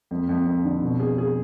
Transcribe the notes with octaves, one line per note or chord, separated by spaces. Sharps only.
F2
F2
F2
D3
B2
G#4
G#4